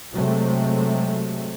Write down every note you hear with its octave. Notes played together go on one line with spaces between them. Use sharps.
C3 F#3 G#3 A3 C4